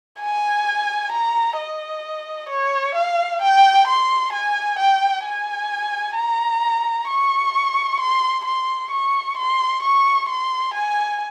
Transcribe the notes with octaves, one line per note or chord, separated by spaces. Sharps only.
G#5
A#5
D#5
C#5
F5
G5
C6
G#5
G5
G#5
A#5
C#6
C6
C6
C#6
C6
C#6
C6
G#5